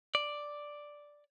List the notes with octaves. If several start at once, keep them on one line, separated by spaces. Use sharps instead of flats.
D5